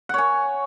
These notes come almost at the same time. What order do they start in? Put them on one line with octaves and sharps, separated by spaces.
F#5 C#5 G#5